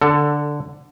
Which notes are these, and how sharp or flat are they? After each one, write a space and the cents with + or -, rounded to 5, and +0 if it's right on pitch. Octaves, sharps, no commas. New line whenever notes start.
D3 +0 A4 +20